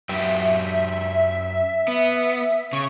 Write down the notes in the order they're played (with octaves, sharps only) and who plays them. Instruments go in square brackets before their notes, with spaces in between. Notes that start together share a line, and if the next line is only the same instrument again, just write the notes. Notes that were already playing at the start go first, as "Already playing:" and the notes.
[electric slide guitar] F#2 G4 [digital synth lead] E5
[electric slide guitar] B3
[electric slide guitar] C#3 [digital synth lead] C#6